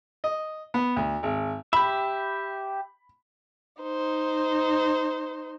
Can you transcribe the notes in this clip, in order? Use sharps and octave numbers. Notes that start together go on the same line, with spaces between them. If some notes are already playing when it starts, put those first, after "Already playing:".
D#5
B3
D2
G#1
G4 E5 B5
D#4 C5